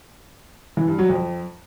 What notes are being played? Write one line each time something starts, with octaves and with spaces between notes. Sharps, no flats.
E3
G2
F#3
F2